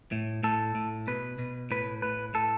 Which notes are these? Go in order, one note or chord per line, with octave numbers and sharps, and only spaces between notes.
A2
A2 A4
A2
B2 B4
B2
A2 B4
A2 B4
A2 A4